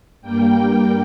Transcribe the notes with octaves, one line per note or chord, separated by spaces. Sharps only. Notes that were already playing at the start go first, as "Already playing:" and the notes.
G2 G3 A#3 G5